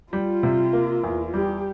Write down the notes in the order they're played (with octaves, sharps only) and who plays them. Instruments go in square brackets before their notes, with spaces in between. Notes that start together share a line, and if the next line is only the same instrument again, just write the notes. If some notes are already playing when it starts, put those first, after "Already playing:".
[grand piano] G3 [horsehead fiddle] F4
[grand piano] C3
A#3
E2
[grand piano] G3 [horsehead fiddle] G4